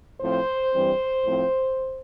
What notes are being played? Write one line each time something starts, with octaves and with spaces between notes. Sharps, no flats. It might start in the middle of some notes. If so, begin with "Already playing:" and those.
A2 F3 C4 C5
G2 E3 G3 C4
A2 F3 C4